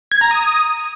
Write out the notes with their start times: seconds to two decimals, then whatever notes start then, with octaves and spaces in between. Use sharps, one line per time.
0.11 G#6
0.21 A#5
0.31 D#6